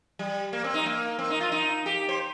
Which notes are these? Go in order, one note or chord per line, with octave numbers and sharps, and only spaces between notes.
G3
A#3
C4
D#4
A#3
C4
D#4
F4
D#4
G4
C5